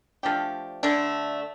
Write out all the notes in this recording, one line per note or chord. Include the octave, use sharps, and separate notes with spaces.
F3 A3 D4 G4
D3 A3 D4